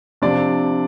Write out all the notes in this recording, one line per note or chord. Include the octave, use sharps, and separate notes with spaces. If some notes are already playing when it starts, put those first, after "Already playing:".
C3 F3 C4 D4 D5